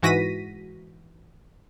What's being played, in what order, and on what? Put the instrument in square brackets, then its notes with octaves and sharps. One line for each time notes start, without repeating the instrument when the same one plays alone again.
[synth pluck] G#2 E3 F#4 A#6 B6 D#7